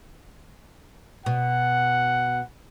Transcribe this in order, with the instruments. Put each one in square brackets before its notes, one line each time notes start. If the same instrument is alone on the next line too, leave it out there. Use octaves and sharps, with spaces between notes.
[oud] B2 [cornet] F#5